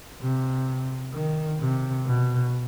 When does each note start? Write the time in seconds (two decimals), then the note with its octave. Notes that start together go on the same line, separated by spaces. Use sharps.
0.21 C3
1.14 D#3
1.60 C3
2.06 B2